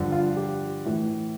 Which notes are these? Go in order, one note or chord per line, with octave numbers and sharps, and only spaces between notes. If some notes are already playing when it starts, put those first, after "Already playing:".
Already playing: G2 D3 F3
F4
G4
A2 E3